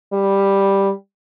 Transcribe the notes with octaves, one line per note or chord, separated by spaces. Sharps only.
G3